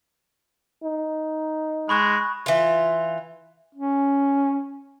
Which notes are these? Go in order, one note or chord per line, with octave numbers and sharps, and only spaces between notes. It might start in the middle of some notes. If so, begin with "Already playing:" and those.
D#4
G#3 B5 C#6 F#6
E3 F4
C#4